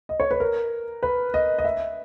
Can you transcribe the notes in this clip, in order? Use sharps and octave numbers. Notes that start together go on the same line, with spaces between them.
D#5
C#5
B4
A#4
B4
D#5
D#5
E5